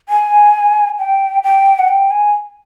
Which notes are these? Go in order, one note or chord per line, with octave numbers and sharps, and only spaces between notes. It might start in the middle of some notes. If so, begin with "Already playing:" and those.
G#5
G5
G5
F#5
G5
G#5